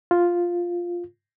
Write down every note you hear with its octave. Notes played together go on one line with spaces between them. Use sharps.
F4